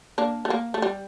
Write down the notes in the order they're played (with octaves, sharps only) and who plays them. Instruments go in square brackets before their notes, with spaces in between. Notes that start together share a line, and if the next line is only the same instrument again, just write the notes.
[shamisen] A#3 D4
A3
A#3
A3
G3